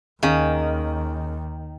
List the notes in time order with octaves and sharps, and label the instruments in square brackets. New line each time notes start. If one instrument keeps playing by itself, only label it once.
[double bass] D#2 [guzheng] D#3 [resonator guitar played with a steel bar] C#4 G#4 F5